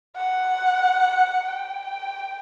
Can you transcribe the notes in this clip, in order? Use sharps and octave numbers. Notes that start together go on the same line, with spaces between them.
F#5
G5